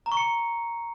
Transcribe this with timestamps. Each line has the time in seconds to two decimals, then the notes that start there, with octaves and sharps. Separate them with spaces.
0.06 A#5
0.12 C#6
0.17 C#7